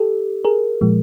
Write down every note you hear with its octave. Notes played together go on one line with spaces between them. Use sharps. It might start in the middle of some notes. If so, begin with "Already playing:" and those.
Already playing: G4 A4
G#4 A#4
A#2 F3 G#3